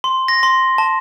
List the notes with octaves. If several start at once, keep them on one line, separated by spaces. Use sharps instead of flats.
C6
A#6
C6
A5